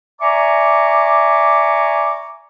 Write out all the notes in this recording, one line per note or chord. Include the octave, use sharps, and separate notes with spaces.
D5 E5 G#5 A#5 C#6 D6